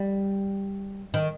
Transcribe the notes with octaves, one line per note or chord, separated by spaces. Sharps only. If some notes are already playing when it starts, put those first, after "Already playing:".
Already playing: G3
D#3